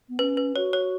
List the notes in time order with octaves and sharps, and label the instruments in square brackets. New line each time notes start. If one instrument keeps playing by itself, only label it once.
[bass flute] B3
[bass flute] C#4 [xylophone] B4
[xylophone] B4
[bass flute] F#4 [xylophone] C#5
[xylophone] C#5